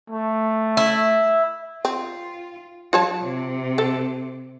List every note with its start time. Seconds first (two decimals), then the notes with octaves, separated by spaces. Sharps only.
0.10 A3
0.77 E4
1.85 C4 F4
2.93 F#3 F4 C#5 A5
3.23 C3
3.78 A4